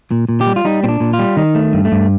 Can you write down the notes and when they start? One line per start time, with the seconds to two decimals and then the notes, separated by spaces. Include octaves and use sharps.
0.11 A#2
0.29 A#2
0.41 G4
0.47 G3
0.56 F4
0.65 G3 D#4
0.83 A#2 C4
0.89 D4
1.00 A#2
1.13 F4
1.19 G3
1.37 D#3 D#4
1.55 A3
1.73 G2
1.85 A3
1.92 G2